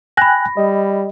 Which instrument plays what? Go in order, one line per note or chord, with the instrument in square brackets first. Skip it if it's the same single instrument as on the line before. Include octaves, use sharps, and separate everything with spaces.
[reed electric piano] G5 G#5 F#6 [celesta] B5 A#6
[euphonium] G3 [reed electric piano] D#5